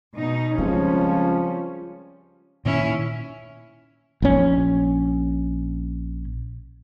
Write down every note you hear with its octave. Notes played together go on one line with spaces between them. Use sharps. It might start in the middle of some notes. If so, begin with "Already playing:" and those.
B2 D#4
C#2 F3 G3 C4 C#4
A#2 D#3 C#4 E4
A#1 C#4